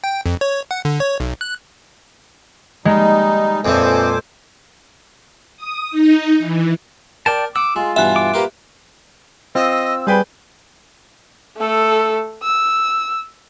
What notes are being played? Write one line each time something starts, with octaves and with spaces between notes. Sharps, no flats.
G5
F2
C#5
F#5
D3
C#5
B1
F#6
G3 G#3 D#4
F2 A#2 E3 A4 C5 G#5 D6
D#6
D#4
E3
A#4 D5 G5 A5
F#5 D6 E6
G#3 F4
G2 B2 E3 E5 F#6
D6
A#3 F4 G4 B4
C4 F4 D#5 E6
G3 G#4 B4 G5 G6
A3 A4
E6